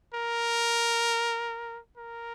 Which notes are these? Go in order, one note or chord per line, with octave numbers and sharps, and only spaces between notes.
A#4
A#4